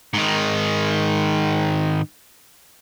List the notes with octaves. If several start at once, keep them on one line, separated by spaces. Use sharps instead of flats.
G#2 D#3